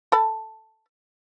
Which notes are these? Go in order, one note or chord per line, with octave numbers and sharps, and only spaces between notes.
A4 A5 B5